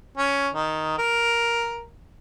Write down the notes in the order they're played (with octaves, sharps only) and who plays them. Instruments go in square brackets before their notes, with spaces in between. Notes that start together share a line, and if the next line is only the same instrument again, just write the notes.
[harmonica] C#4
D#3
A#4